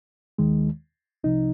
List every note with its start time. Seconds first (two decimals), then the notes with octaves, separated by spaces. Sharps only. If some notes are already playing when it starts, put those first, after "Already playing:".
0.38 D#2 D#3 G#3
1.24 C2 C3 F3 D#4